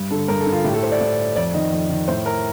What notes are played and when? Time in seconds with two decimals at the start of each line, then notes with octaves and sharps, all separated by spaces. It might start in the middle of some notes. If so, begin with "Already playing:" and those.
Already playing: G2
0.11 D3 A4
0.28 G2 A#4
0.40 A4
0.47 D3
0.52 F4
0.64 A2 G4
0.73 A4
0.83 C5
0.92 D5
1.01 A2
1.36 F2 D5
1.54 D#3 D#5
1.73 F2
1.90 D#3
2.08 A2 C5
2.26 A#4